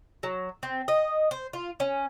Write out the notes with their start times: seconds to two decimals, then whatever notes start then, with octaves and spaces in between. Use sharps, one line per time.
0.23 F#3
0.63 C4
0.88 D#5
1.31 C5
1.53 F4
1.80 C#4